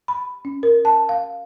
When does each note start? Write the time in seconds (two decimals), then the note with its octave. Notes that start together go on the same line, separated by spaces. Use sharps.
0.08 B5
0.45 C#4
0.63 A#4
0.85 A5
1.09 F5